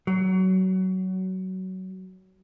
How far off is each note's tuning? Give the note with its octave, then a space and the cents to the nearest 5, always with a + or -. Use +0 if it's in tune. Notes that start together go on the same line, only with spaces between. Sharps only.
F#3 +20